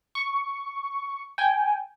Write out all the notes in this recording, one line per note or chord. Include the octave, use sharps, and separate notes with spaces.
C#6
G5 G#5